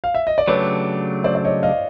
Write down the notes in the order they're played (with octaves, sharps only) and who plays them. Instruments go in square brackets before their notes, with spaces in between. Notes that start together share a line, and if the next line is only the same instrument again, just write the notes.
[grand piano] F5
E5
D#5
D5
[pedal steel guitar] C#3 F#3 A3 D4 G4 [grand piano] B4 C#5
[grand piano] C5 D5
D5
C#5 D#5
D#5 F5